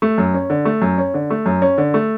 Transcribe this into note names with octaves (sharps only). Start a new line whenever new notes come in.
A3
F#2
C#4
D3
A3
F#2
C#4
D3
A3
F#2
C#4
D3
A3